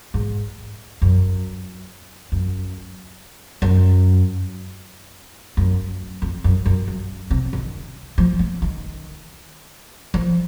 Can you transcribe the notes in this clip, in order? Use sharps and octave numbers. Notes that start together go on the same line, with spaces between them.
G#2
F#2
F#2
F#2
F#2
F2
F#2
F#2
F#2
C3
D#3
F3
F3
D#3
F3